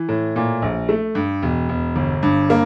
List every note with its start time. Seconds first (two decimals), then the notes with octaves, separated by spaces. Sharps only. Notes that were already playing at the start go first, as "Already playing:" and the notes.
Already playing: E3
0.09 A2
0.36 A#2
0.62 A#1
0.89 A3
1.15 G2
1.42 E1
1.69 E1
1.96 G1
2.23 G2
2.50 A#3